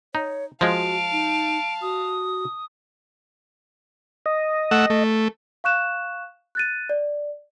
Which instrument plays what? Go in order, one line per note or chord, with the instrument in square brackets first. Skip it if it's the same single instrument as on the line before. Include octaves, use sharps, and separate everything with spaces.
[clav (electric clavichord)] D#4 [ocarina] C#5
[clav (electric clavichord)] F3 G#3 [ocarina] F#4 [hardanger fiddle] F5 A5 [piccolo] D7
[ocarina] D#4
[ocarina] F#4 [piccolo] D#6
[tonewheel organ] D#5
[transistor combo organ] A3 F#5 E6
A3
[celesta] F5 C#6 F#6 E7
F#6 A6 D#7
D5